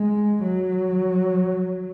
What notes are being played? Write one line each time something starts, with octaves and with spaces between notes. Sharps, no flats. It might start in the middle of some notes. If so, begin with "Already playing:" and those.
Already playing: G#3
F#3